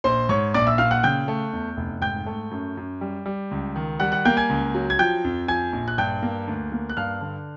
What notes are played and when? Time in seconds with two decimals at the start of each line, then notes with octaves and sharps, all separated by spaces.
0.04 A#1 C5 C6
0.29 G#2 C#5 C#6
0.54 A#1 D5 D6
0.67 E5 E6
0.78 A#2 F5 F6
0.91 F#5 F#6
1.03 C#3 G5 G6
1.28 A3
1.53 E2
1.77 F1
2.02 G#2 G5 G6
2.26 A3
2.51 F#2
2.77 F#2
3.01 G3
3.26 G3
3.51 C#2
3.76 D#3
4.00 G3 F#5 F#6
4.12 F#5 F#6
4.25 A#3 G5 G6
4.37 G#5 G#6
4.49 C#2
4.75 F#3
4.90 G#6
4.99 F3 G5 G6
5.24 F2
5.48 F3 G#5 G#6
5.73 A#1
5.88 F#6
5.98 G2 G5 G6
6.23 A#3
6.47 D2
6.72 A#3
6.90 F#6
6.97 G2 F5 F6
7.21 D3